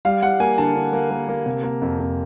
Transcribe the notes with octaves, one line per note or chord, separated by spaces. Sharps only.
G3 F5
G3 F#5
A#3 G#5
D3 A5
D3
A#3
A#3
A#3
C3
A#3
F2
F2